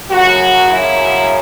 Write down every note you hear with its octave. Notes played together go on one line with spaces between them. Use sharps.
F#2 C#3 F#3 F#4
E4